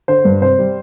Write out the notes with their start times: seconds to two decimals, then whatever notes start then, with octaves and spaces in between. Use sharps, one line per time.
0.08 D3 C5
0.25 G2
0.42 C3 C5
0.59 G3